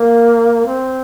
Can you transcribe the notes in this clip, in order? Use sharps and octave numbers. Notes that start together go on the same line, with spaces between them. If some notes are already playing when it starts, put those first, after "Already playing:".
Already playing: A#3
C4